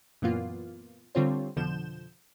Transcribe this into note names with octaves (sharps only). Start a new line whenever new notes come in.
F#2 A#2 E3 A#3 B3 F4
D3 G3 C4 F4 C5 C#5
F2 B2 D3 F3 G6 E7